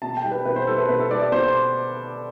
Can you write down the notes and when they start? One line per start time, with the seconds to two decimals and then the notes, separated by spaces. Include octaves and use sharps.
0.02 B2 A5
0.17 G5
0.24 G3
0.32 B4
0.45 B2 B4
0.56 C5
0.67 G3 A4
0.78 B4
0.89 B2 B4
1.00 A4
1.11 G3 D5
1.21 D5
1.32 B2 C5